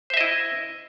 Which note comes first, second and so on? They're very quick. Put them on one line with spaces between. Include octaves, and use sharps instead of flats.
C5 E5 D#5 E4